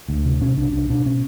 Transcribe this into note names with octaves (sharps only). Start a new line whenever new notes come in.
D2
C3
B2 C#4
C2 D4
C2 D4
B2 D4
B2 C#4